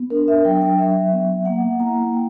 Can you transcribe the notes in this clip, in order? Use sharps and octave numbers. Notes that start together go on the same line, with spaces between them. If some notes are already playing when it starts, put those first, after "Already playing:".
Already playing: B3
D4 A#4
E5
F#3 G5
G5
F#3 E5
B3
A#3 F#5
E4 A#5
A#3 G5